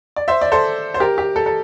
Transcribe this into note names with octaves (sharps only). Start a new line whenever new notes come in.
D5
C5 E5
D5
A4 C5
C5
G4 A#4
G4
A4
A4